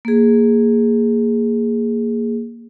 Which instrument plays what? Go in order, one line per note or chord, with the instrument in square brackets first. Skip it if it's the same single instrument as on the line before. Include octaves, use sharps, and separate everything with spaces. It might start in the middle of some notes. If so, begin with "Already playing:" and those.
[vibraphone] A#3 G#4